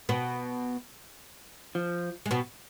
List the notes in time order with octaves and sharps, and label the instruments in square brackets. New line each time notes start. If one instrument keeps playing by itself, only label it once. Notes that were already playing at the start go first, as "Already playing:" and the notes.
[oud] B2 B3
[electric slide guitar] F3
[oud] G#3
B2 B3